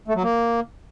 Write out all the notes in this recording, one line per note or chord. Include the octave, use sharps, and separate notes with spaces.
A3
F#3
A#3